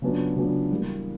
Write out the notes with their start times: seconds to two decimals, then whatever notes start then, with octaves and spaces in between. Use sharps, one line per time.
0.02 C#3 F#3 B3 D4 F4
0.36 C#3 F#3 B3 D4 F4
0.71 E3 G3 A#3